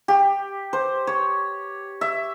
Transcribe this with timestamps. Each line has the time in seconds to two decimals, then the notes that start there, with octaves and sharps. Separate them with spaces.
0.08 G4
0.73 C5
1.07 C#5
2.01 E5